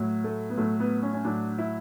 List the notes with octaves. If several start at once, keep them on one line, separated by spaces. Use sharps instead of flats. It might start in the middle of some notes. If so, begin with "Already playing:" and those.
Already playing: A2 F#3
A3
B3
A2 F#3 A3
B3
C#4
C#4
A2 F#3 D4
E4